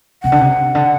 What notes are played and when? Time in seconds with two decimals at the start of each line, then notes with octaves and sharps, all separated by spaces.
0.23 C3 F#5
0.32 D3
0.41 C3
0.75 D3